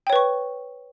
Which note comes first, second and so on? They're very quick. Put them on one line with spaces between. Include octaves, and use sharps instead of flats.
G5 C#5 B4 C#6